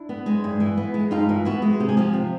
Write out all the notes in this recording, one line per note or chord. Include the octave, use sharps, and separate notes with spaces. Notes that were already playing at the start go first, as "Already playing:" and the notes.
Already playing: D4 E4
B3
G#3
G2
E3
B3
G#3
G2 D#4 F4
E3
B3 E4 F#4
G#3
C3 G4
G#4
F3 F4 G4
C3